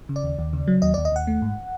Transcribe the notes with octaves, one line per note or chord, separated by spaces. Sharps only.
C#3
D5
D#2
D#2
C#3
F#3
D#2 D#5
D#2 D5
D#5
D#2 F#5
A3
G#2